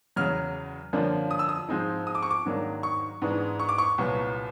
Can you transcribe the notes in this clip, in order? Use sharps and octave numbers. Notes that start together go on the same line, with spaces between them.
E2 C#3 F#3 F6
F#2 D3 F3 A#3 D4
D#6
E6
D#6
G#2 F3 G#3 C4 D#4
D#6
D6
C#6
D6
G#2 D#3 F#3 A#3 D4
C#6
G#2 E3 G#3 B3 D4
C#6
D6
C#6
C2 A#2 F#3 B3